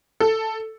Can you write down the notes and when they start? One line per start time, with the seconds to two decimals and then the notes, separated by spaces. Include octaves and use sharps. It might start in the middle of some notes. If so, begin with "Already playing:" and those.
0.20 A4